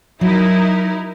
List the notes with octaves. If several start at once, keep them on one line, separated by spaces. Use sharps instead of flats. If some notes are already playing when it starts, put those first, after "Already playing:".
F#3 D#4 E4 A#4